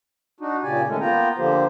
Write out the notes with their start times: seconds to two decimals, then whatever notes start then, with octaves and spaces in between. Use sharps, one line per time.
0.40 D4 D#4 F#4
0.63 A#2 C#3 G4 D5 G#5
0.87 D#3 G#3 A3 C#4
1.00 A#3 B3 F4 G5 A#5
1.38 D3 F3 A#3 G4 C5